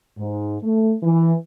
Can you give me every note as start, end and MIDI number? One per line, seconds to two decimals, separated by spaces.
0.18 0.58 44
0.62 0.93 57
1.02 1.33 52